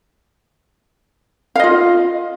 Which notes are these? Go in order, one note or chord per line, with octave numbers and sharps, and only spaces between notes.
F4 D#5 F5